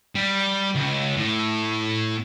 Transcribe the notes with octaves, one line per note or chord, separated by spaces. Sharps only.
G3
C#2
A2